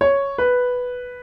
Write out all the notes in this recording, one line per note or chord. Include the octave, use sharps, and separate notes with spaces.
C#5
B4